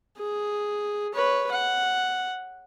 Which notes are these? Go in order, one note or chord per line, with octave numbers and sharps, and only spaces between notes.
G#4
B4 C#5
F#5